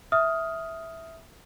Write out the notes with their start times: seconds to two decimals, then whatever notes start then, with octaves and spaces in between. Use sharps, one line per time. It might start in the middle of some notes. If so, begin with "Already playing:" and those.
0.12 E5 D#6 F6